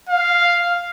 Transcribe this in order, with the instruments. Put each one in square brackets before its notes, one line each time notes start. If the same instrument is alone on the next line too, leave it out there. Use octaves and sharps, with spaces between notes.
[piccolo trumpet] F5